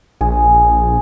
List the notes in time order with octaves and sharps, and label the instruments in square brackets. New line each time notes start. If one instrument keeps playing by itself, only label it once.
[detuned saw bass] A#1 [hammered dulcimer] G#4